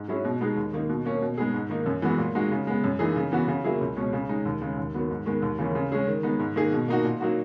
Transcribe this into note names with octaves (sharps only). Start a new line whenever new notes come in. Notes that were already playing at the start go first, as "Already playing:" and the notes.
Already playing: G#2
F#3 C#4 E4 G#4
B2
G#3 B3 D#4 G#4
D#2
D#3 A#3 D#4
B2
A#3 C#4
B2
G#3 B3 D#4 G#4
G#2
D#3 A#3 D#4
F#2
E3 G#3 B3 F#4
A#2
G#3 D#4 F#4
C#3
G#3 B3
F#2
E3 A#3 D#4 G#4
C#3
E3 B3 F#4
C#3
F#3 A#3 E4 G#4
C#2
B2 G#3 C#4
C#3
G#3 D#4
D#2
C#3 G#3
D#2
D#3 F#3 B3
G#2
D#3 G#3 B3
D#2
C#3 E3 A#3 C#4
C#3
G#3 C#4 G#4
D#3
G#3 B3 D#4
G#2
D#3 A#3 D#4 G#4
B2
A#3 D#4 F#4
A#2
F#3 A#3 D#4 F#4